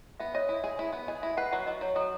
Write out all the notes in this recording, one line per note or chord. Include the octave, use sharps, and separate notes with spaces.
B3 E5
C#5 D#5
E4
G#4
E4
B3
G#4 D#5
E4 E5
B4 F#5
F#3 F#5
F#3 D#5
F#3 C#5
F#3 A4